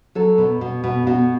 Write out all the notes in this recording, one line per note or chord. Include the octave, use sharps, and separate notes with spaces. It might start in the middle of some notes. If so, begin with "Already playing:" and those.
F#3 A4
B2
B2
B2
B2 F#4